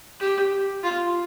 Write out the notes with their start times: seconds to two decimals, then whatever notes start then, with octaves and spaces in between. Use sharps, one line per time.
0.20 G4
0.83 F4